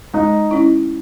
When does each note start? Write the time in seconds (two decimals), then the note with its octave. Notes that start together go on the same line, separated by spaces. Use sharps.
0.14 G#3 D#4
0.51 C#4 E4